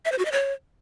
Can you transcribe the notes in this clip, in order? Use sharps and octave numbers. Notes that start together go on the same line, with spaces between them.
E5
C5
F#4
D#5
C#5